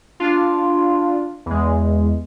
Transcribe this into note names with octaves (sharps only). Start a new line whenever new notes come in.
D4 F4
E2 G#3